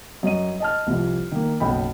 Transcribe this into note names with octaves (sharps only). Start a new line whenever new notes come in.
F#2 D#5 D#7
D#5 A5 F6
C2 F2
D#3 A#3
F#1 B1 D#5 G5 B5